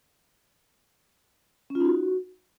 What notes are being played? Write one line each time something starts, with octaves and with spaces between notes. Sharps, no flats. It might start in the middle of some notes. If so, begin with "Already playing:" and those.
C#4
F4
D#4
F#4